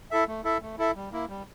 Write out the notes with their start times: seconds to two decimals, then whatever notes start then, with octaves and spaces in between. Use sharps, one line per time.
0.11 E4 A4 E5
0.28 A3
0.44 E4 A4 E5
0.62 A3
0.78 E4 A4 E5
0.96 G3
1.12 A#3 E4
1.29 G3